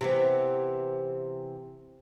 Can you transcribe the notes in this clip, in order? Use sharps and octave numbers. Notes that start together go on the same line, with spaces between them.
C3 E3 B3